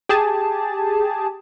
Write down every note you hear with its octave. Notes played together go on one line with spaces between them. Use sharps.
G4 G#4 A5